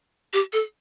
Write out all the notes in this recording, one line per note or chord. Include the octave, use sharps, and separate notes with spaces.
G4
A4